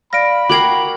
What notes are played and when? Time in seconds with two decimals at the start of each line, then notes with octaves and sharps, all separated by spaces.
0.13 D5 F5 B5 F6 A#6 D7
0.50 F#4 A#4 G5 D6 G#6 C7 F#7